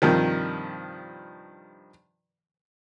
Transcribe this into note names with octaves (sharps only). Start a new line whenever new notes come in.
G2 C3 D#3 F3